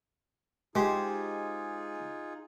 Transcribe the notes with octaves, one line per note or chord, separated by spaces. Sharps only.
G#3 D#4 F4 G4 G#4 C5